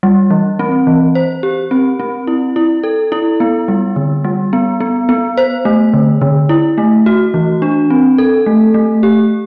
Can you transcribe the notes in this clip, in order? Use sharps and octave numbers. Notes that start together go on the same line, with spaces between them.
G3
E3
C4
E3
C5
G4
C4
C4
E4
E4
A4
E4
B3
G3
D3
G3
B3
B3
B3
C5
A3
D3
D3
E4
A3
F#4
E3
D4
C4
A4
A3
A3
G4